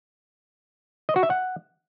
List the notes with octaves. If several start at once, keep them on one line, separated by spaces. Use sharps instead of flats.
D#5
F#4
E5
F#5